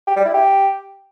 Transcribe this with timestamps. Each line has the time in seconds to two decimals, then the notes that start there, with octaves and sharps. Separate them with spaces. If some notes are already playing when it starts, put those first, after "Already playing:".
0.07 G4
0.16 G3
0.25 E4
0.34 G4